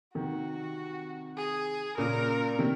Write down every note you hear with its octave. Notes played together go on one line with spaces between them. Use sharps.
C3 D#3 F#4
G#4
A#2 C#3 A#4
C3 D#3